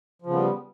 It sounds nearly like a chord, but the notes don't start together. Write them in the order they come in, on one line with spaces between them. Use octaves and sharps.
F3 C#3 B3 G3